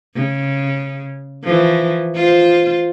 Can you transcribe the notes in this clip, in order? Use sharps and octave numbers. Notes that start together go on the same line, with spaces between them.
C#3
E3 F3
F4 C5